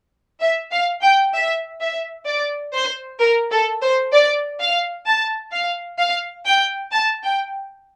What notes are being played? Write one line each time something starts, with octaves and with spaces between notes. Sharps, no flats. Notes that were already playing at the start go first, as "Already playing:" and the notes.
E5
F5
G5
E5
E5
D5
C5
A#4
A4
C5
D5
F5
A5
F5
F5
G5
A5
G5